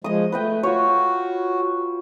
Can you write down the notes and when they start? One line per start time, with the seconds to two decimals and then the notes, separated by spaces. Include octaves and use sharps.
0.04 F3 G#3 D#5 D#6
0.32 A3 B4 D#5 G5
0.63 F4 F#4 C#5